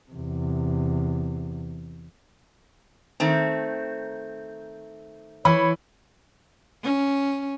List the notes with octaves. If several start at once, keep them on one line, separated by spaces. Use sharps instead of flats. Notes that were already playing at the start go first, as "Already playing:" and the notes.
E2 C3
D#3 A3 C4
E3 C#5 B5
C#4